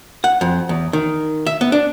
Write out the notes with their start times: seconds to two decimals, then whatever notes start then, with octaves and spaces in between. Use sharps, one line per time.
0.24 F#5
0.41 F2
0.69 E2
0.93 D#3
1.47 E5
1.61 B3
1.72 D4